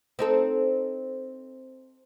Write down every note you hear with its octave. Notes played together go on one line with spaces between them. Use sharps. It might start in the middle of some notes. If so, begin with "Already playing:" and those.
C4 D#4 A4